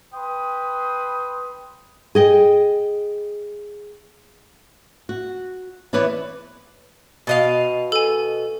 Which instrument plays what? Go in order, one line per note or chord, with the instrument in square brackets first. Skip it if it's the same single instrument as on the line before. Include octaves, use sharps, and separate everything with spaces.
[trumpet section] B4 G5 C6 D#6
[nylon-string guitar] G#4 D#5 G5
F#4
E3 B3 E4 B4 C#5 D5
[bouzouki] B2 D#5 F5
[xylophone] A4 G#5